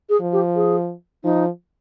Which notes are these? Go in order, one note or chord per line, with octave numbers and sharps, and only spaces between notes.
G#4
F3
G4
G#4
F3 D#4